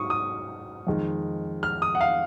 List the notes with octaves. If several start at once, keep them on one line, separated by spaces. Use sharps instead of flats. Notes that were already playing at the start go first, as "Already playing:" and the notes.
Already playing: G#2 F#3 C#6 D#6
D#6
F2 D#3 G#3
F6
D#6
F#5
F5